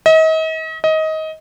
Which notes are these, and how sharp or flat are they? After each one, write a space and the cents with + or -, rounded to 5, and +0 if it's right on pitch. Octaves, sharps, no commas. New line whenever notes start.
D#5 +40
D#5 +20